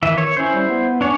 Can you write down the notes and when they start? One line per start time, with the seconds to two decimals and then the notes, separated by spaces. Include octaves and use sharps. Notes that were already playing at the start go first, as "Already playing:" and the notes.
0.03 D#3 E3 E5
0.18 C#5
0.37 C#4 E4 C5
0.54 G3
0.68 B3
1.01 C#4 D4 C#5